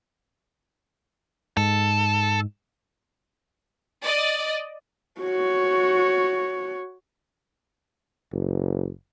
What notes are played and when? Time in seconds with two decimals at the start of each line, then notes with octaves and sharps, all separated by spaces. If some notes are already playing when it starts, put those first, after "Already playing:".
1.57 G#2 A4
4.03 D5 D#5
5.21 F#4 C#5
8.32 F#1